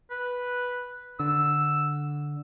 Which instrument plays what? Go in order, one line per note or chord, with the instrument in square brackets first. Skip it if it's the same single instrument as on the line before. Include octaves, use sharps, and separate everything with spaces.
[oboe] B4
[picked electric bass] D3 [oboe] E6